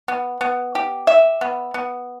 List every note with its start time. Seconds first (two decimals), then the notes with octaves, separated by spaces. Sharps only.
0.08 B3
0.41 B3
0.75 G4
1.07 E5
1.41 B3
1.74 B3